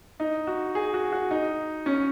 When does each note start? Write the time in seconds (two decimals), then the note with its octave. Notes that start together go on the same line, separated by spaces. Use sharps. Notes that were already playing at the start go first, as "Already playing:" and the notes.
0.20 D#4
0.47 F#4
0.75 G#4
0.94 F#4
1.12 F#4
1.31 D#4
1.86 C#4